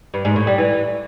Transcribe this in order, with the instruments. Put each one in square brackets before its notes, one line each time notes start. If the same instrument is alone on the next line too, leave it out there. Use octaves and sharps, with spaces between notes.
[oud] G2
G#2
A2
G3
E3